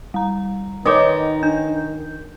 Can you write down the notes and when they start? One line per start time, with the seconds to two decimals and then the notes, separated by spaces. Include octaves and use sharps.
0.14 G3 A#5
0.85 D#3 D#4 A#4 B4 C#5 D#5 D6 D#6
1.43 D4 G6